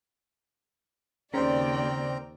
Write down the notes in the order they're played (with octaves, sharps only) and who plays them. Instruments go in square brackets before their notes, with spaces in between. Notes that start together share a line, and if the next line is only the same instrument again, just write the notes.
[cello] D#2 G5 [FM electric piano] C#3 C5 [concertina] C4 A#4 A#5 [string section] D5